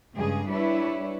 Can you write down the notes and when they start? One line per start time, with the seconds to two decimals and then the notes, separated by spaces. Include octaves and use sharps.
0.15 G2 C#3 G#3 G#4
0.48 G3 D4 E4 B4 C#5